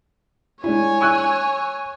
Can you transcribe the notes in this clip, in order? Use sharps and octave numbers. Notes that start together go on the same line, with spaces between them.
G#3 D4 E4 C#5 G#5
C#6 E6 F#6